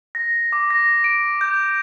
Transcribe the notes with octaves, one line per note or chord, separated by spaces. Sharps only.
A#6
D6
A#6
D7
G6